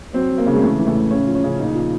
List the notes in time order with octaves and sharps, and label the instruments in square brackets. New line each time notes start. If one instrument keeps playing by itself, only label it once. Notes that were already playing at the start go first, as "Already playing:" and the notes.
[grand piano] F#3 C4
F#3
A#3
C#3
G#3
E3 A3
E3
A3
A2
C#3 C#4
F3
C#4
C#3
A#2 D#4
F3